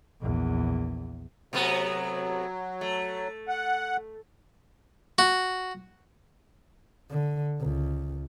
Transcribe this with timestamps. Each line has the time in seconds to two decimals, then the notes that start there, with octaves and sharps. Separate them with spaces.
0.22 A#1 E2
1.53 C3 F#3 A3 B3
2.81 A3
3.48 F#5
5.18 F#4
7.10 D3
7.60 C#2